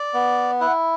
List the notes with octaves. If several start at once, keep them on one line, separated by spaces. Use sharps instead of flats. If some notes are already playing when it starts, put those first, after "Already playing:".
Already playing: D5
B3
E4 F#5